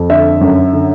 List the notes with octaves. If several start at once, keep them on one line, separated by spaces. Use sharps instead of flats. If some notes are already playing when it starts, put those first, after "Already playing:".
Already playing: F2
D3 E5
F#2
D3